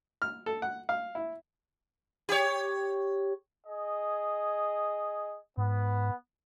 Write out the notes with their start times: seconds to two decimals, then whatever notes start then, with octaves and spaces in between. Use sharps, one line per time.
0.22 F6
0.46 A4
0.62 F#5
0.89 F5
1.15 E4
2.29 G4 C#5
3.66 G#4 D#5
5.57 G#2 B3